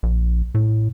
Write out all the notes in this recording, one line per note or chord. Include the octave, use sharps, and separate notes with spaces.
A#1
A2